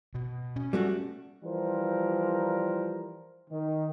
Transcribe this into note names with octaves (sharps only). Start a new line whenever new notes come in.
B2
C#4
G3 A3 F#4
E3 F3 G3 A#4 C5
D#3